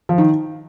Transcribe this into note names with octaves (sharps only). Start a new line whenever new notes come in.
F3
D#3